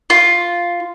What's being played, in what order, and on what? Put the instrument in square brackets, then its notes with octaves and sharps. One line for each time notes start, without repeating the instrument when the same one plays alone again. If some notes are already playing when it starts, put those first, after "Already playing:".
[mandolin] F4